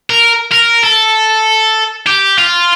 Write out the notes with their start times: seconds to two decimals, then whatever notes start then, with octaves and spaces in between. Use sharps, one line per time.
0.10 A#4
0.52 A#4
0.84 A4
2.07 G4
2.39 F4